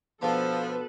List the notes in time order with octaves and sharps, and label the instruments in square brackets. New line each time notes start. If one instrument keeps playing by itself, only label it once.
[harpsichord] B2 B3 D4 [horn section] F3 [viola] A4 B4